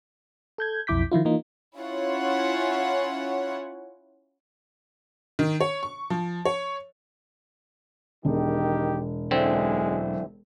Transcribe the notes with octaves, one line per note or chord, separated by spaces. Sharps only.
A4 G6 G#6
B1 F2 E4 D6 G6 B6
D#3 F3 E4 F4
E3 A#3 D#4 F4
C#4 E4 F4 C#5 F#5
D#3
C#5
C#6
F3
C#5
E1 D#3 D#4 G4
B1 F#2 D3 F#3 G#3 C4 E4 E5